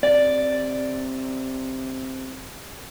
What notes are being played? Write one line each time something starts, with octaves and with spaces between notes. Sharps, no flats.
C3 D5